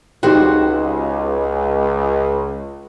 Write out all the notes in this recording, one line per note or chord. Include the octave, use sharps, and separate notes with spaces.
C#2 D#4 F#4 G4 C5 G5